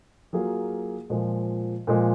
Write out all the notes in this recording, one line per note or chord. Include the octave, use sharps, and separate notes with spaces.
F#3 A#3 F4 G#4
A#2 F3 G#3
A#2 F3 G#3